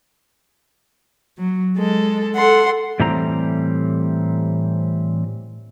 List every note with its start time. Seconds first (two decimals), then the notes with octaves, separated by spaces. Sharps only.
1.38 F#3
1.76 G#3 A4
2.34 A4 F#5 C6
3.00 A2 E3 G3 C4 A#5